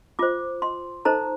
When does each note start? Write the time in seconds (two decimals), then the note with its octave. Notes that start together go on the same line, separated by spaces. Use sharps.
0.19 F4 C5 D6
0.62 C6
1.05 D#4 A4 C5 A#5